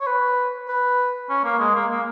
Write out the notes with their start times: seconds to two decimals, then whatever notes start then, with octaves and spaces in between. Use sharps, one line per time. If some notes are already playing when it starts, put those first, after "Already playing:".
0.01 C#5
0.06 B4
0.68 B4
1.29 C#4
1.44 A#3
1.59 G#3
1.75 A#3
1.91 A#3